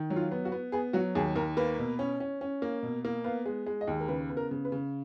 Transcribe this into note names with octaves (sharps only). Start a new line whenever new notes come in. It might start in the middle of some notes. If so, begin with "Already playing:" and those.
Already playing: D#3
F#3
F4
B3
F#4
B3
B3 G#4
F#3 F#4
D#2 G#4
D#2 A#4
A#3 B4
B2
C#4
C#4
C#4
A#3
B2
A#3
B3 F5
G#3
G#3
D#5
D#2
A#4
C#3 B4
B3
A#4
C#3
B4
C#3